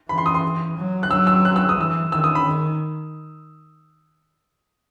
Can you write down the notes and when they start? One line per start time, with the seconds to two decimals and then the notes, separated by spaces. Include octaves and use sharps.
0.09 E3 B5
0.18 C6
0.26 D#6
0.34 C6
0.77 F#3
1.03 F#6
1.10 F#3 E6
1.27 E6
1.45 F#6
1.56 E6
1.69 D#6
1.78 E3 E6
2.12 D#3 E6
2.24 D#6
2.35 B5
2.45 D#3